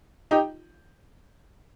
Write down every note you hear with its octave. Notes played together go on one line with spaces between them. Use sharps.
D#4 G4